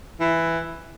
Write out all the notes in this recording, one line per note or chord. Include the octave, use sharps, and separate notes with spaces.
E3